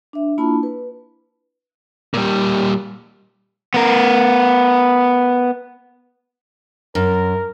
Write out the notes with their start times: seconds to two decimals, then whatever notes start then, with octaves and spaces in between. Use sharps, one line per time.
0.13 D4 E5
0.38 A#3 D4 E4 F4 A5 B5
0.63 B4
2.14 A#2 G3
3.74 B3 A#4
6.95 F#2 A#4